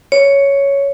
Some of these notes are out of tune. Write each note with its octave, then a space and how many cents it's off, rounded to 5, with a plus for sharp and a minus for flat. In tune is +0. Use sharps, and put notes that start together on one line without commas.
C#5 +5